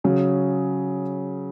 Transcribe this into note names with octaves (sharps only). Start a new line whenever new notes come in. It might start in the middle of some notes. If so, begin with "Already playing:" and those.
C#3 F#3 C#4 G#4